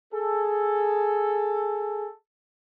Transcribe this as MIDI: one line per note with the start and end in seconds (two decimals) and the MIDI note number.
0.13 2.08 68
0.13 2.08 69